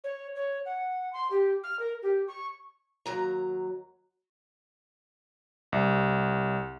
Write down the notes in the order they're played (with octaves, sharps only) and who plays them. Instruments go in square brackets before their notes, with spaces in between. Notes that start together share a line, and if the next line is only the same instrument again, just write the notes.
[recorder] C#5
C#5
F#5
C6
G4
F6
A#4
G4
C#6
[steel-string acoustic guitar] D#2 F#3 A#5
[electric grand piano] C2